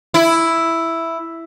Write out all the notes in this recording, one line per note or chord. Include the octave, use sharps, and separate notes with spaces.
E4